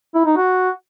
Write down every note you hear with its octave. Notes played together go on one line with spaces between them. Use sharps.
E4
D#4
F#4